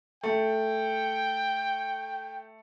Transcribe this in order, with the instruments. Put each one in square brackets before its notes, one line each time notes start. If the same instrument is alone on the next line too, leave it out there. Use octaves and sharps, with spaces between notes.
[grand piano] A3 [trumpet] G5